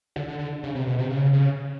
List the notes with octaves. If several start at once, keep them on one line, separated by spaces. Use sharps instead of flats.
D3
D3
D3
C#3
C3
B2
C3
C#3
C#3